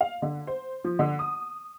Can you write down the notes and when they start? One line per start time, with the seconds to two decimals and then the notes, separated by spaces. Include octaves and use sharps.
0.01 F5
0.22 D3
0.47 C5
0.84 F3
0.99 D3
1.19 D#6